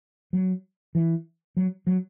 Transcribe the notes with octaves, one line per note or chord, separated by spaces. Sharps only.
F#3
E3
F#3
F#3